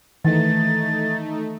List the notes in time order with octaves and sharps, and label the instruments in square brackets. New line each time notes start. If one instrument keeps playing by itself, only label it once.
[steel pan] D#3 E3 [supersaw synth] A3 D#4 [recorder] A6